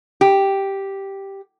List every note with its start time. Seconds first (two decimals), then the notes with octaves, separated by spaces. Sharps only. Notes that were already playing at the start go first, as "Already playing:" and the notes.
0.21 G4